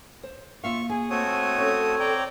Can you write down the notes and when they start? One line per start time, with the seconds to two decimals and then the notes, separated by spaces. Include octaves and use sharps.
0.23 C5
0.64 A#3 F4 E5 F5 C#6
0.89 G#4 G#5
1.10 A3 C4 F#4 C#5 D#6
1.58 C#4 A4
2.00 D5 G5 A#5